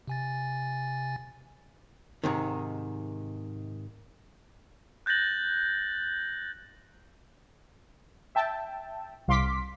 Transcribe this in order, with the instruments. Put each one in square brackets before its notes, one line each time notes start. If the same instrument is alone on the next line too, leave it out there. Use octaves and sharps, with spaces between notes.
[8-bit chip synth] C3 G#5 A6
[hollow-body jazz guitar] G#2 C3 D#3
[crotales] F#6 G6 A6 A#6 F#7
[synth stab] E5 G5 A5
C2 F5 C6 D6 B6